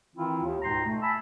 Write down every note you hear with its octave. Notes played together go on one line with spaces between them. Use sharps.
D#3 E3 C4 E4 F4
D#2
C#2 G#2 B2 G5 A#5 C6
A3
E5 G#5 A5 B5